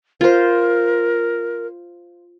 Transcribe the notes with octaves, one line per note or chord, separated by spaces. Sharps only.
F4 A#4 C5